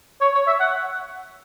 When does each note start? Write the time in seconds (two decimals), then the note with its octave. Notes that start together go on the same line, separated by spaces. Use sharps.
0.21 C#5
0.35 C#5
0.47 E5
0.60 F#5